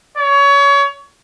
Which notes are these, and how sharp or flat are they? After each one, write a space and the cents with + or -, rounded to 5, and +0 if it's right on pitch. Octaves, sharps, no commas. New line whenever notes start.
C#5 +25